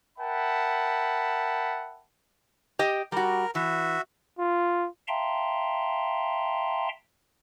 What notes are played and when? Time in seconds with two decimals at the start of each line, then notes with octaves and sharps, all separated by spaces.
0.19 A#4 E5 F#5 G5 A5 B5
2.79 G4 D#5
3.12 G3 F#4 A#4
3.55 E3 F#4 E5
4.39 F4
5.08 E5 F5 G5 A5 A#5 C6